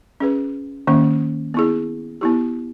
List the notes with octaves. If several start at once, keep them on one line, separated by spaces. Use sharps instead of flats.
C#4 G#4 B4
D#3 A#3 C#4
B3 E4 G#4
B3 E4 G4